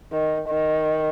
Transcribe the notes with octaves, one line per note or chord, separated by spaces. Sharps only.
D#3
D#3